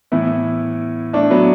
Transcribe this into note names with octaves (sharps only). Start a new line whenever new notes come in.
A2 E3 B3 E4
A3 D4
F#3 B3